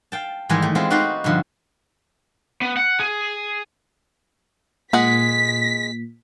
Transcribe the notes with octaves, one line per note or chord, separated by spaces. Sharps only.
F5 G5 A5
G#2 D#3 E3 G3 D#5 G#5
A3
G#3 B3 C4 F4
D#4 F#4 B4 D5 F5 C6
G2 B2 D3 F3
B3
F#5
G#4
A#2 G#3 F#5 B6